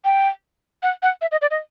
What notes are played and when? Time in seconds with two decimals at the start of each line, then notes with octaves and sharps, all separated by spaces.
0.05 G5
0.83 F#5
1.03 F#5
1.21 E5
1.32 D#5
1.42 D5
1.51 D#5